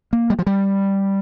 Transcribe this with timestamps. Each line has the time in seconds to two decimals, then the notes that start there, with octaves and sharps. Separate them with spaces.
0.13 A#3
0.30 G3
0.39 F3
0.47 G3